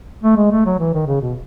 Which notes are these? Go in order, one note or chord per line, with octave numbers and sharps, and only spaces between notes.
A3
G#3
A3
F#3
E3
D#3
C#3
B2